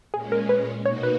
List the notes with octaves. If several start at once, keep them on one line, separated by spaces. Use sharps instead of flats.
A#2 G#3 C#4 G#4
A#4
B4
B2 A#3 D#4 F#4 C#5
B4